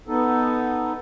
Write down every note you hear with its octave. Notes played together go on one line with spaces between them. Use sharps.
B3 D#4 A4